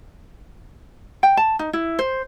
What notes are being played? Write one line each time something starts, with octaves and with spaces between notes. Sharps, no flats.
G5
A5
D#4
E4
C5